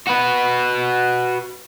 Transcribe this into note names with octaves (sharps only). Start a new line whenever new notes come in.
F#4 B4